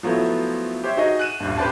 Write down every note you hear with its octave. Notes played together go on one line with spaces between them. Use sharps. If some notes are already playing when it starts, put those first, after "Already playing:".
F3 F#3 A3 B3 E4
G4 C5 C#5 E5
D#4 F#4 G#4 D#5
F#6 D#7 E7
D#1 A1 G2
G4 B4 C5 D5 A5